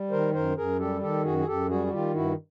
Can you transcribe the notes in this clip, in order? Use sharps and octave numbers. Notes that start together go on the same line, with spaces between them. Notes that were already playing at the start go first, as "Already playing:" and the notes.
Already playing: G3
D#3 A#4 C5
F#2 A#4 C5
F#2 G#4 A#4
G3 G4 A4
D#3 G4 A4
F#2 F#4 G#4
G#4
F#2 G4 A4
G3 F#4 G#4
F#4
D#3 F4 G4
G2 E4 F#4